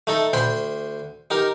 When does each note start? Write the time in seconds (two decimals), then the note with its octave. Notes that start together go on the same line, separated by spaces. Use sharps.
0.07 A3 D#4 A4
0.33 D2 C5 G5 B5
1.30 D#4 G4 A#4